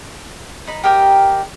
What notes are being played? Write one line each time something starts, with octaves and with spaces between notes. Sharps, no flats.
D#4 B5
G4 A#4 D#5 G5